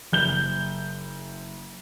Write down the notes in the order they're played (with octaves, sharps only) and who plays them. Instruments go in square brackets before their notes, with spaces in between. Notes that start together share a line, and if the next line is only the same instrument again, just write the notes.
[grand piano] F#1 G6 G7